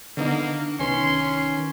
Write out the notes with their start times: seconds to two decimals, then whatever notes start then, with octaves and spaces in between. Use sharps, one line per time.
0.17 D3 A#3 B3 D4 D#4
0.79 C2 D#3 C#4 D#4 B4 C6